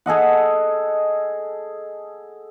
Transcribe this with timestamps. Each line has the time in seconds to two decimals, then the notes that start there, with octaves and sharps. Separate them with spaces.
0.06 G#4 A4 D#5 F#5